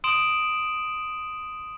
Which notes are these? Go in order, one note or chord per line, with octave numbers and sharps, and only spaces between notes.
C6 D#6 D7 E7 F#7